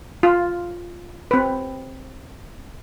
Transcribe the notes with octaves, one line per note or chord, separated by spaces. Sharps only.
F4
C4 B4